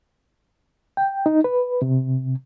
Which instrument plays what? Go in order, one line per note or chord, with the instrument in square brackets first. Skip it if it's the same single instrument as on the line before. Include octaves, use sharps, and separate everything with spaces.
[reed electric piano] G5
D#4
B4
C3